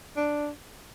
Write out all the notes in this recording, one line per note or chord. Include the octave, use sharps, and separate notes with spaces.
D4